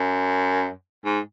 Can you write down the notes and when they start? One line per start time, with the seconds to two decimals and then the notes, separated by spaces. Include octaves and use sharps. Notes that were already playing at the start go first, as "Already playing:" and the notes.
Already playing: F#2
1.05 G#2